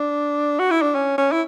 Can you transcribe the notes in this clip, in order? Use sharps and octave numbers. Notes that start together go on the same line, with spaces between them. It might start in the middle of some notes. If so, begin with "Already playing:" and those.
Already playing: D4
F#4
E4
D4
C#4
C#4
E4